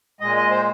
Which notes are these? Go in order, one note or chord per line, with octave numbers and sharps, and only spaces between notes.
A#2 G#3 D#5
D#5
C5